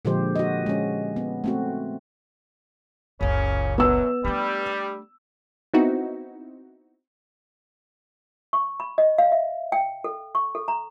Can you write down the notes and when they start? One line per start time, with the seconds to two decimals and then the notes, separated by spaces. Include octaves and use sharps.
0.05 A#2 D3 F3 G#3 G4 C5
0.36 F#4 D#5
0.66 G#3 C#4
1.16 B3
1.44 A3 C4 F#4
3.21 F#1 C#2 A#2 C#3 C#4
3.78 F#2 B2 F#3 B3 E6
4.25 G3 A3 D4
5.74 B3 C4 D#4 E4 F#4
8.53 C#6
8.80 B5
8.98 D#5
9.18 F5
9.32 E5
9.72 G5
10.04 A4
10.35 C#6
10.55 A4
10.68 A#5